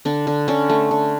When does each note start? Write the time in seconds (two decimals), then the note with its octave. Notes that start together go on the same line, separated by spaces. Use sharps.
0.05 D3 D4
0.27 D3
0.48 D3 C#4
0.70 A3
0.91 D3